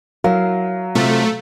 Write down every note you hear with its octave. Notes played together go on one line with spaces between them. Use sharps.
F#3 E4 A#4 F5
C3 A3 F4